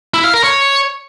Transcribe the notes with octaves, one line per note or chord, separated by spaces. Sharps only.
E4
F5
A#4
C#5